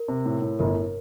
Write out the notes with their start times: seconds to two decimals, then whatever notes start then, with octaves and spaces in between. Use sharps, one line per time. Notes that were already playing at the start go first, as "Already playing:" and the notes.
Already playing: A#4
0.08 C3
0.26 A2
0.42 A2
0.59 G1 A#4